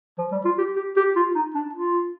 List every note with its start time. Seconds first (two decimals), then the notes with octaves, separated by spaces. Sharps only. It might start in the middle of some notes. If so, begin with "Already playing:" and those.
0.18 F3
0.32 G3
0.45 F4
0.58 G4
0.76 G4
0.96 G4
1.16 F4
1.35 D#4
1.55 D4
1.74 F4